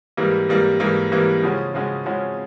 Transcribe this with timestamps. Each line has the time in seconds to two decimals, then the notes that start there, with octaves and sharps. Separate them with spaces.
0.17 G#2 E3 G3 A#3
0.49 G#2 E3 G3 A#3
0.80 G#2 E3 G3 A#3
1.12 G#2 E3 G3 A#3
1.43 C#3 F3 G#3 C#4 F#4
1.74 C#3 F3 G#3 C#4 F#4
2.05 C#3 F3 G#3 C#4 F#4